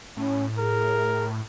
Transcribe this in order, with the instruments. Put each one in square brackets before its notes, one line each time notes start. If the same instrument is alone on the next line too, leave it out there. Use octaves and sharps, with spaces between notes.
[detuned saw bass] A2 [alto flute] C#4
[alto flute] G#4 [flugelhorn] A#4